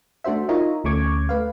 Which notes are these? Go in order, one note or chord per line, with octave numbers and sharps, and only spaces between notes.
A3 D4 F#4 C5 E5
D#4 F4 A#4 C#5 D#5 E5
D2 A3 C#4 C#6 D6 G#6
A3 B4 F5